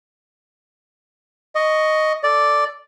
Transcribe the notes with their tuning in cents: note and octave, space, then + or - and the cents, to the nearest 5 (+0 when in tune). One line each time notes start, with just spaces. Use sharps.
D#5 +0 C#6 +10
A4 +0 D5 +0